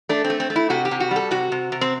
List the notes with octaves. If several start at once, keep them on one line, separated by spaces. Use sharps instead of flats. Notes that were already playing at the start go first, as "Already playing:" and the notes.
A3 D4
C4
A3
C4
A3
E4
C3 F#4
G4
C3
F#4
G3
A4
C3 F#4
C3
C3
C4